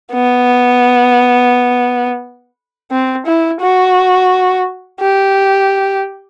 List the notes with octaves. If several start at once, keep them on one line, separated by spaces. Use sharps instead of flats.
B3
C4
E4
F#4
G4